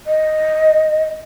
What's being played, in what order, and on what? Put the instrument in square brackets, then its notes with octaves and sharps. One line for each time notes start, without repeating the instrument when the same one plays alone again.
[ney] D#5